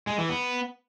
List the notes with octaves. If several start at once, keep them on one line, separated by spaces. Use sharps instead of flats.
G#3
E3
B3